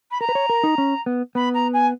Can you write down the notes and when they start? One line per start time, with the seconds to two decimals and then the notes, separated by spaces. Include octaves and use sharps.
0.11 B5
0.20 A#4 A#5
0.29 B4
0.35 C#5
0.50 A#4
0.64 D#4
0.78 C#4
1.06 B3
1.35 B3 B5
1.54 A#5
1.73 G#5